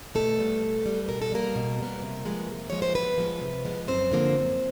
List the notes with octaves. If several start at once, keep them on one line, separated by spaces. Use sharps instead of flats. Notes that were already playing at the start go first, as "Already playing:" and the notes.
B2 A3 A4
G3 B3
B2
G3 B3
B2 A#4
A4
G3 A#3 B3 A#4
B2
G3 B3
C3
F3 G#3 B3
C3
F3 G#3 B3 C#5
C5
C3 B3 B4
F3 G#3 B3
C3
F3 G#3 B3
F#2 C4 C5
D3 F3 A#3
F#2